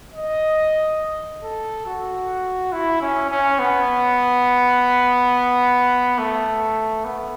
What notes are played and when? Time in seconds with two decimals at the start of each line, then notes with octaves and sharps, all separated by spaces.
0.13 D#5
1.43 A4
1.86 F#4
2.73 E4
3.01 C#4
3.30 C#4
3.59 B3
6.18 A3
7.04 B3